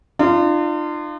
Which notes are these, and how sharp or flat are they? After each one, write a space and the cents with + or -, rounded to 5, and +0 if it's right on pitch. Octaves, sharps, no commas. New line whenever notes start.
D4 +45 F4 -20